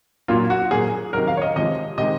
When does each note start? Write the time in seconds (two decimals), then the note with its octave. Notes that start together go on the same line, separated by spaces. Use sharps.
0.28 A#2 F#3 A#3 F4
0.50 F#4
0.71 A#2 F#3 A#3 G#4
1.13 C3 D#3 F#3 A#4
1.28 F5
1.37 C#5
1.42 D#5
1.56 C3 F3 G#3 D#5
1.98 C3 D#3 G#3 D#5